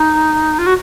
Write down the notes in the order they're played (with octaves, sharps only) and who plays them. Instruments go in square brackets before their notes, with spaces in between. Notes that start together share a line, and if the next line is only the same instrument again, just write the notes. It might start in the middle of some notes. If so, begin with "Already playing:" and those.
Already playing: [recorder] D#4
F4
F#4